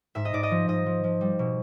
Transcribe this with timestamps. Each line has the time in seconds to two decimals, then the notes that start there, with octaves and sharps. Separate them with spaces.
0.15 G#2 E5
0.25 D#5
0.33 G#2 D5
0.43 D#5
0.51 F3
0.68 G#2 D#5
0.86 F3
1.04 F3
1.21 G3
1.39 B2